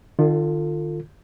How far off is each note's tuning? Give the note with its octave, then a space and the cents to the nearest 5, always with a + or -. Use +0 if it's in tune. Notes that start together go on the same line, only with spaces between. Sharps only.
D#3 -45 F4 +0 A4 +30